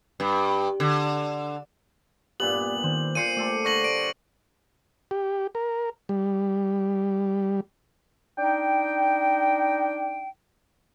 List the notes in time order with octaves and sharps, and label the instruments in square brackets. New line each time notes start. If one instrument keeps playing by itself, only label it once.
[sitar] G2
D3
[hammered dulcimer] G2 A#2 B3 [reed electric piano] G4 D5 [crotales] F#7
[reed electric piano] D#3 [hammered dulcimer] C5
[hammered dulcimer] A#2 C5 [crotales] C7 C#7 D#7
[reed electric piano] A3 [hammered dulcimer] G4 A4 C5
[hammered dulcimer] D3 [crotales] C#6 A#6 F#7
[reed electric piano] D5 [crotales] D7
[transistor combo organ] G4
A#4
G3
[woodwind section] D4 D#4 G5